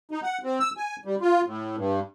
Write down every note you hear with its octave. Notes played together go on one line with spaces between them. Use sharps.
D#4
F#5
C4
E6
G#5
G3
F4
A2
G2